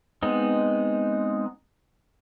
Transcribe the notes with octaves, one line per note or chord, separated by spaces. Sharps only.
G#3 B3 C4 D#4